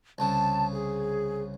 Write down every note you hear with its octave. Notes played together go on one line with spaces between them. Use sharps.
C2 C#3 A5
G#4